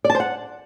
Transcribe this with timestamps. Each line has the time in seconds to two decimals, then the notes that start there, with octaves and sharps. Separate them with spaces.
0.05 D5
0.10 A5
0.15 C5
0.20 F#5